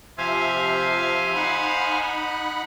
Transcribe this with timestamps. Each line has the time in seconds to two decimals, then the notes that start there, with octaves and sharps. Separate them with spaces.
0.18 C3 F3 C5 E5 F5 G#5
1.35 D#4 F#5 B5